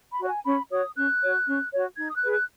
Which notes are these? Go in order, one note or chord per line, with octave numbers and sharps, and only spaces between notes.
B5
F#4 C#5
G#5
C#4 B5
F#4 C#5 D#6
C#4 F#6
F#4 C#5
C#4
F#4 C#5
D#4 G#6
D#6
F#6
G#4 B4
F#6